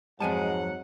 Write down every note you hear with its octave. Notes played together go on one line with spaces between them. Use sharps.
F2 G#2 F#3 G#3 F#5 G#5 A5